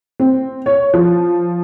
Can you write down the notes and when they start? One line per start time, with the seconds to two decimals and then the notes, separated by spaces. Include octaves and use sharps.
0.20 C4
0.66 C#5
0.94 F3